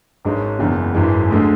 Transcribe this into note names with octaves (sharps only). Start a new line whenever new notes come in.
G#1 G#2 G#3 C#4
F#1 E2 C#3 G#3
G#1 F#2 E3 G#3
D2 D3 G#3